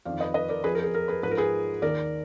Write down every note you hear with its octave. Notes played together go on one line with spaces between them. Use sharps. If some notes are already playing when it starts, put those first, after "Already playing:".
F2 D#3 D5 F5
B4 D#5
B4 D#5
A#4 D5
F2 F3 G#4 B4
A#4
G#4
A#4
G#4 B4
G#2 F3 B4
A#4
G#4 B4
D#2 D#3 A#4 D5